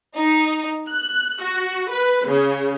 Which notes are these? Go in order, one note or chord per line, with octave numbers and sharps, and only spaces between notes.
D#4
F#6
F#4
B4
C#3